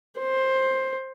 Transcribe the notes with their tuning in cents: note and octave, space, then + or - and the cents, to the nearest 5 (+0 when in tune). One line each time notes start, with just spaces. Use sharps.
C5 +15